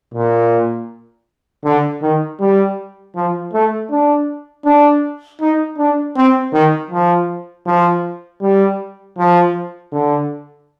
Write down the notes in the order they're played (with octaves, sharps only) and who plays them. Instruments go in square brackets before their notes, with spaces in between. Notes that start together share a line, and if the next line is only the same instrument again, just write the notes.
[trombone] A#2
D3
D#3
G3
F3
A3
D4
D4
D#4
D4
C4
D#3
F3
F3
G3
F3
D3